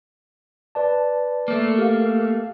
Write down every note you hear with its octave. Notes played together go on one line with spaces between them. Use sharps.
B4 D5 A5
A3 A#3
G4 F5